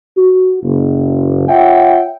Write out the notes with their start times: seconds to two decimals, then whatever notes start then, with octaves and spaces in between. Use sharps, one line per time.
0.17 F#4
0.63 F#1
1.49 F4 C#5 E5 F#5 G5